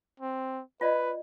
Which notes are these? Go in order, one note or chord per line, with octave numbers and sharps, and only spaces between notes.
C4
F4 B4 D5 D#5